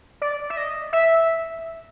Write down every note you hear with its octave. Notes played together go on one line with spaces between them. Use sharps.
D5
E5
D#5
E5